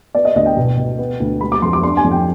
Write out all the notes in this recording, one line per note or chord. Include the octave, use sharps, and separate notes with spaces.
B3 D5
D#5
D2 D#5
G5
B2
B2
B3
D2
G#3 B5
D6
F2 C6
D6
D4 C6
G#5
F2
G5